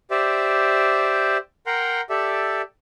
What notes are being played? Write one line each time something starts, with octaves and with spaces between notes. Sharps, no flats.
G4 C5 D5 E5
A#4 F#5 G5 A#5 C6
G4 A4 D5 E5